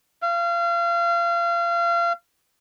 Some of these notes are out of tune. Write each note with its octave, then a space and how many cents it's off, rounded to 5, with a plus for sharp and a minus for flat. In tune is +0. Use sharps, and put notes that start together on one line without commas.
F5 -30